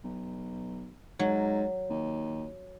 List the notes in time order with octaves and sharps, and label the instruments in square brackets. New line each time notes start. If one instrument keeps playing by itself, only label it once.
[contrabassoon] B1
[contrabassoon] G#2 [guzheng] F#3
[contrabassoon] D#2